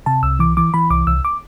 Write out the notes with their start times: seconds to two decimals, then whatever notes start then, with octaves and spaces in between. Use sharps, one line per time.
0.06 C3 A5
0.23 C2 E6
0.39 E3 D6
0.57 E3 D6
0.74 E3 B5
0.90 C2 D6
1.07 C2 E6
1.25 D6